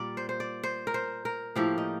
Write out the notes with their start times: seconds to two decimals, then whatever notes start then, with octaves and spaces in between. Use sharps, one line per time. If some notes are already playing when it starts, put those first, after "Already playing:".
Already playing: A#2 G3 A#3 A#4 D5
0.17 C5
0.29 C5
0.40 D5
0.63 C5
0.87 A#4
0.94 C5
1.25 A#4
1.55 A2 F3 A#3 G4
1.78 D#4